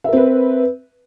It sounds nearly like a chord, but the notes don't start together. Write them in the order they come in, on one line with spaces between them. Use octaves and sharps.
E5 A#4 C4 B4